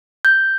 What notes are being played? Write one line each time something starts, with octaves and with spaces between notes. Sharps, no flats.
G6